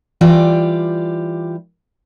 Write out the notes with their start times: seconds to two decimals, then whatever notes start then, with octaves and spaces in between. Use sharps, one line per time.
0.21 E3 G3 F4 G4 D5